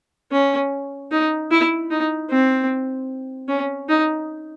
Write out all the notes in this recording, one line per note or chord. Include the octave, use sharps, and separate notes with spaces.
C#4
D#4
E4
D#4
C4
C#4
D#4